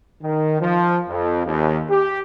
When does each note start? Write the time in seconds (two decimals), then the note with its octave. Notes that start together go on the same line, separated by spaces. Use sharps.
0.22 D#3
0.61 F3
1.08 F2
1.46 D#2
1.90 G4